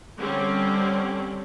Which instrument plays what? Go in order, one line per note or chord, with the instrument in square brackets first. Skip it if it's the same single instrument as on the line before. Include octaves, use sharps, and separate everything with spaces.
[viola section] D3 G3 C4 C#4